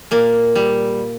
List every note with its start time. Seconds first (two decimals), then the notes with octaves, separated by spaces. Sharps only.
0.11 A#2 A#3
0.55 G3